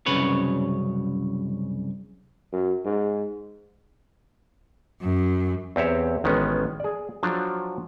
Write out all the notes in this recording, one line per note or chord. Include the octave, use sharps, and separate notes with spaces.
C2 F#2 C#3 B4 C#5
F#2
G#2
F#2
E2 C4 G4 C#5 E5
A1 D#3 G#3 B3 C#4
G#4 D5
F3 F#3 D4